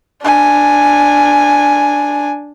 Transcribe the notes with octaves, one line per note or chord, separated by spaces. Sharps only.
D4 G#5